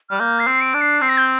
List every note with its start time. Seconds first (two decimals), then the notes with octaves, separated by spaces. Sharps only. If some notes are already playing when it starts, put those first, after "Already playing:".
0.10 G3 F6
0.19 A#3 G6
0.40 C7
0.47 C4
0.61 D7
0.74 D4
0.81 C7
1.02 C4 C7
1.09 A#6
1.18 G6